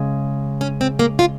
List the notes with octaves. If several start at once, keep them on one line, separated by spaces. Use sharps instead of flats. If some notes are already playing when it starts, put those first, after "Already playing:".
Already playing: C#3 G#3
C#4
C4
A#3
F4